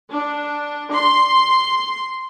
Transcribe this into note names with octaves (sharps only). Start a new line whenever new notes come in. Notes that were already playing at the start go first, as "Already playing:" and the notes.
D4
C6